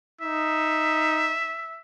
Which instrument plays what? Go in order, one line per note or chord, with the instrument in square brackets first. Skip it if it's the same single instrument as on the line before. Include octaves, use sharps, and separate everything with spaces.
[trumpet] D#4 [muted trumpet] E5